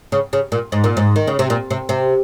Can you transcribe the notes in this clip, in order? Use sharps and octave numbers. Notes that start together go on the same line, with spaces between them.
C#3
C#3
A#2
G#2
A#2
G#2
D#3
C#3
C3
A#2
C3
C3